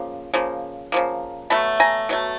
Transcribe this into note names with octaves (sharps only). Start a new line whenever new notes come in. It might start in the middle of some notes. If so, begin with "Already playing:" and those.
Already playing: C#3 F3 A#3
C#3 F3 A#3
C#3 F3 A#3
B2 F#3 A3 A5 B5
G#5 A#5
B2 F#3 A3